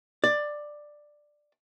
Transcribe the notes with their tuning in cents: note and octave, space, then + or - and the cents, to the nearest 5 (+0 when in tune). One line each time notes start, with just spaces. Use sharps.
D5 +10